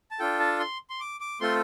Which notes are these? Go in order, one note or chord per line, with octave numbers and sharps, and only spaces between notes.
A5
D4 F4 A4 G5
A5
C6
C6
D6
D6
A3 C4 F4 A4 C6